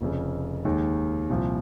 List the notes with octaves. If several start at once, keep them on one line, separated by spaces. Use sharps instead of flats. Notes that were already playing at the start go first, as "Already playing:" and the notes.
F1 F2 C#3
D#2 D#3 G#3
C2 A#2 F3